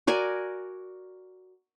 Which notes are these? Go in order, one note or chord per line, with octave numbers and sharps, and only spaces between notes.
F#4 A#4 D5 G#5